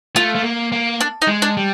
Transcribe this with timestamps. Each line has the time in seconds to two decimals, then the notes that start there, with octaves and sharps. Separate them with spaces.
0.16 A3 F4
0.35 A3
0.43 A#3
0.72 A#3
1.01 D4
1.22 D#4
1.28 G#3
1.42 D4
1.57 G3